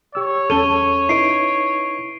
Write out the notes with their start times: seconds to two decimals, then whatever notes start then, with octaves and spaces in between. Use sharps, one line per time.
0.15 G4 C#5 E6
0.50 E2 C#4 A4 D#7 G7
1.09 D#4 E4 B4 C7 D7